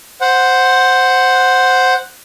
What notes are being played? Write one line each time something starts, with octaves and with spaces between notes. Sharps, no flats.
C5 F#5